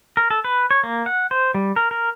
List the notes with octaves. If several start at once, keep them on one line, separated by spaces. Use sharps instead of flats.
A#4
A4
B4
C#5
A#3
F#5
C5
G3
A#4
A#4